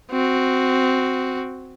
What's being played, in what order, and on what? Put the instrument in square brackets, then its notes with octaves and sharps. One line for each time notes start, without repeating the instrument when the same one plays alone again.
[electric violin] C4 F#4